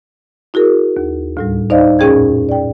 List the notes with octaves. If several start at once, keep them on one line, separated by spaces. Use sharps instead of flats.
E4 F#4 G#4 A#4
D#2
D2 A2 G3
D#4 C5 D5 D#5 F5
F2 A#2 C#4 G#4 G5 G#6
D5 G5